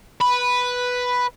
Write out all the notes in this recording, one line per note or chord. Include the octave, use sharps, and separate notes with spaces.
B4